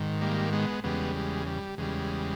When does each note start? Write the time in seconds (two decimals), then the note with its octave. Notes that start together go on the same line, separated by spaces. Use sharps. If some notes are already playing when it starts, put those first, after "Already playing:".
Already playing: G#2 D#3
0.21 G3 A#3
0.53 G#3 B3
0.84 E2 C#3 G3 G#3 B3
1.16 G#3
1.47 G3
1.78 E2 C#3 G3 G#3